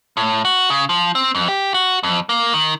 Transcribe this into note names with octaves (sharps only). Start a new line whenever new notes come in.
A2
F#4
C#3
F3
C4
F2
G4
F#4
F2
A#3
D#3